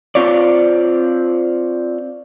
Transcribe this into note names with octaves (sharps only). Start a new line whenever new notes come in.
C4 F4 C#5 D5